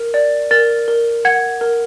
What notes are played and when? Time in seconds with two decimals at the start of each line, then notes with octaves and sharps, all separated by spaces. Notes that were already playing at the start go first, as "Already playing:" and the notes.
Already playing: A#4
0.14 D5
0.51 A#4 A6
0.88 A#4
1.25 F#5 G#6
1.61 A#4